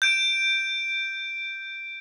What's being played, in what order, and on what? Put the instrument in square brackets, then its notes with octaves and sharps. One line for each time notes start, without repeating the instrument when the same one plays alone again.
[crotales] G6 D7